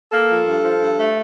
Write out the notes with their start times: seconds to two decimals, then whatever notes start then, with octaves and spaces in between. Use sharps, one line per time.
0.12 A#3 A4
0.29 F3
0.46 G2
0.63 F3
0.80 G2
0.98 A3